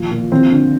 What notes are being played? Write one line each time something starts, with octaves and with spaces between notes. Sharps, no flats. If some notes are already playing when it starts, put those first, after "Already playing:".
Already playing: A#2 F3
A#2
F3 C4
D3